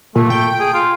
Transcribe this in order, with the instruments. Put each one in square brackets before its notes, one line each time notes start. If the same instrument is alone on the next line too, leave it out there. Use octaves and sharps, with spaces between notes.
[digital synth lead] A#2 [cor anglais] A3
[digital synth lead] G5
[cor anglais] G#4
F4